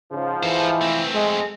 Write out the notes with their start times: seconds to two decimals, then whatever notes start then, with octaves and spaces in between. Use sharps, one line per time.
0.12 G#2 C#3 F3
0.43 E3 A4 C5
0.81 A3 C4
1.15 G#3